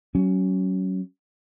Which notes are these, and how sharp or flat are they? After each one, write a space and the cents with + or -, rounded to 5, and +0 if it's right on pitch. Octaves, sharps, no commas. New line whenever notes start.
F#3 +25 C#4 +10